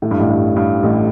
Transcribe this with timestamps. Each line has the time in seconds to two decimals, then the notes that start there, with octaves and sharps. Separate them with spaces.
0.02 A2
0.11 G2
0.19 A1 A2
0.29 G2
0.56 G2
0.83 A1 A2